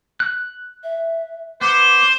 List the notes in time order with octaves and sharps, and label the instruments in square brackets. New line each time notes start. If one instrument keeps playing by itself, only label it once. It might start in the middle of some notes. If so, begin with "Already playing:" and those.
[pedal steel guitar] F#6
[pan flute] E5
[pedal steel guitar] B3 [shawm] C5 [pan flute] D6